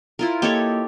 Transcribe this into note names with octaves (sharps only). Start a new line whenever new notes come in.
E4 F4 A#4
A#3 G4 A4 C#5 D#5